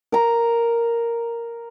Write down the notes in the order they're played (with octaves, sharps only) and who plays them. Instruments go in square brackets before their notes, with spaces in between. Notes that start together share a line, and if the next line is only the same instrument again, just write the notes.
[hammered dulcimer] A#4 A#5